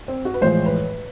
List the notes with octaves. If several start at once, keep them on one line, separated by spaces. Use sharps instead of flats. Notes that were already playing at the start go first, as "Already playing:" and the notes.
C4
F#4
B4
A1 A2 F3 G#3 C5
B4